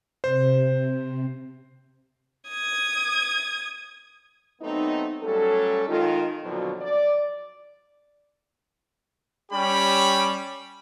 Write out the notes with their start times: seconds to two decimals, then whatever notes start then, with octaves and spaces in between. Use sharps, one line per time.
0.24 C3 C5
2.49 D#6 G#6
4.62 F#3 A3 B3 C4 D#4
5.23 F#3 G3 A3 C#4 A4
5.88 D#3 G#3 D#4 F4
6.43 F2 B2 D3 D#3 F3 F#3
6.81 D5
9.52 G3 C#4 G4 B5